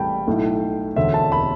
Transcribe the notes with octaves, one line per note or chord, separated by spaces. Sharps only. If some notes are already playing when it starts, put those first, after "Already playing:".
Already playing: A1 A2 E3 G3 G5 A5 B5
B1 A2 A3
E1 D2 D3 E5
A5
B5